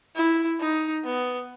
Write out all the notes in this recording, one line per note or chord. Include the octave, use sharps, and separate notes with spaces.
E4
D#4
B3